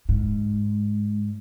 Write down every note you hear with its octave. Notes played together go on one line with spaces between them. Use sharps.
G#2